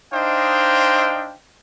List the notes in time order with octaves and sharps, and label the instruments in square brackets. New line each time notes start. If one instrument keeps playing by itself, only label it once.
[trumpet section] D4 D#4 C5 D#5 F5 G5